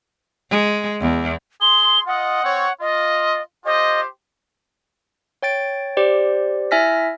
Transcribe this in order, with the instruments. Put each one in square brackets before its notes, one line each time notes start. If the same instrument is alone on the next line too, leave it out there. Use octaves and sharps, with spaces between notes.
[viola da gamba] G#3
E2
[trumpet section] G#4 C6 [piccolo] G7
[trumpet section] F4 D#5 [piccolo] F#5
[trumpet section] C4 C#5
[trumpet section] F4 [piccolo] D#5
[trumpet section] F4 G4 C5 [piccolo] D#5
[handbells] C#5 G5 A6 D7
G4 C5 D5
E4 E5 G#5 F6 A#6 B6